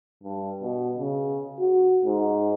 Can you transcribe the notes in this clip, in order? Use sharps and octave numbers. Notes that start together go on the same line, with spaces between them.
G2
B2
C#3
F#4
G#2